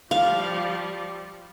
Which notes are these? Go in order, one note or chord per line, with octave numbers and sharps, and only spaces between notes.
F3 G3 F5